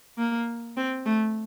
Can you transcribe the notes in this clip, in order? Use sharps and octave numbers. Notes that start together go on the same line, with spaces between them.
A#3
C4
A3